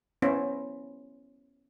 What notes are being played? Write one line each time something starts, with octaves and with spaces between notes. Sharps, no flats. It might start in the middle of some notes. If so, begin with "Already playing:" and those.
B3 C#4 E4 C5